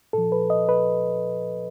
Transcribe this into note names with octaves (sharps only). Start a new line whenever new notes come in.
A#2 F3 A4
B4
D#5
B4